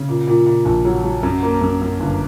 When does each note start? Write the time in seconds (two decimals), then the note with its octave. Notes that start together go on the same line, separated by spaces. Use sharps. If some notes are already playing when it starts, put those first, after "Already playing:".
Already playing: C#3
0.09 A#2
0.27 A#2
0.46 A#2
0.65 A#1
0.85 F#3
1.04 F#3
1.23 F#2
1.43 A#3
1.61 F#2
1.81 F#2
2.00 G1